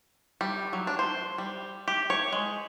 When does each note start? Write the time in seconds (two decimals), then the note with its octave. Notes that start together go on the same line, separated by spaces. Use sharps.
0.41 G3
0.73 F#3
0.87 D4
0.99 C5
1.38 G3
1.88 G4
2.10 C#5
2.33 G#3